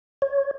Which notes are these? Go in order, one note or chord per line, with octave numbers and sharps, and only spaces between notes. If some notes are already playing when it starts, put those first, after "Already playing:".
C#5